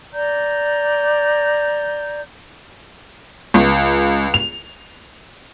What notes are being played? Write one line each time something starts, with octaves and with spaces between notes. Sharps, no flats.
D5 A#5 G6
C#2
F7